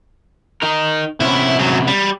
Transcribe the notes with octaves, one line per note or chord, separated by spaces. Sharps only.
D#4 A#4
C3 B3 C#4 E4
G#2 F#3
G3